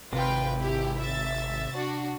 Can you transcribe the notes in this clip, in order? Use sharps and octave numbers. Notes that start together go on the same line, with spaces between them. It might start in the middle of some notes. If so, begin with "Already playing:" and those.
G#1 C3 F4 B4 G5
E4 G4
E5 A6
D4 F#4